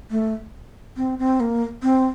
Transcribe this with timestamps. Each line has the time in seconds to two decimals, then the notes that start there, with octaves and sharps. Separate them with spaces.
0.11 A3
0.97 C4
1.19 C4
1.40 A#3
1.83 C4